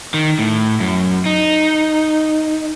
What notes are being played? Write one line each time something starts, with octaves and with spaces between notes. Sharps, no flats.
D#3
A2
F#2
D#4